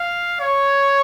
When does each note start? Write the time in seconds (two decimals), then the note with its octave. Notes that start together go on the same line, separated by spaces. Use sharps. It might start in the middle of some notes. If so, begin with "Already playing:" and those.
Already playing: F5
0.40 C#5